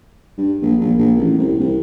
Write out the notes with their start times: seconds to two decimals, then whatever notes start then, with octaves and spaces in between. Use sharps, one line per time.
0.38 G2
0.62 A#1
0.81 A#1
0.98 A#1
1.18 A1
1.38 C2
1.60 C2